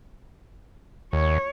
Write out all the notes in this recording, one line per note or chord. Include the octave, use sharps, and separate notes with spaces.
D#2 C#5